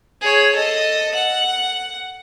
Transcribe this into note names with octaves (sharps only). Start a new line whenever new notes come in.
G#4 C#5
A4 D#5
F#5